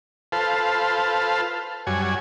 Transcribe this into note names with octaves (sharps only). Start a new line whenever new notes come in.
F4 A4 B4 C5 F5 A5
F#2 G3 F#4 C#5 G#5